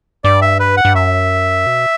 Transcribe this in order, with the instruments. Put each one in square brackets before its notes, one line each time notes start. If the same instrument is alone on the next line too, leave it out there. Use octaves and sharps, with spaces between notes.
[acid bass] G2 [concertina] D5
[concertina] E5
B4
F#5
[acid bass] G2
[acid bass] F#2 [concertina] E5
[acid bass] B2